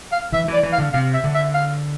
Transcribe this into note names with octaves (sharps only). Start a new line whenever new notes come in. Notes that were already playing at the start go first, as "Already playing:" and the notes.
F5
E3 E5
E3
D5
E3
F5
D3
C3 F5
E5
D3
E5
F5